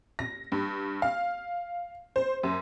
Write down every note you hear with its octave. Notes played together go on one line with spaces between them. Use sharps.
A#6
G2
F5
C5
F#2